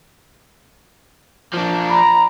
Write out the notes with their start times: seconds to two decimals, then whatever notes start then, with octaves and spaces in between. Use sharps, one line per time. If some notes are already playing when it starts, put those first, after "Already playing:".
1.54 F3 A#3 D4
1.90 A#5 B5